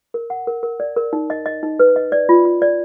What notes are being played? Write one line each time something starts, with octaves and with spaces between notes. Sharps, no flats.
A#4
F#5
A#4
A#4
D5
A#4
D#4
D#5
D#5
D#4
B4
D#5
D5
F4
F4
D5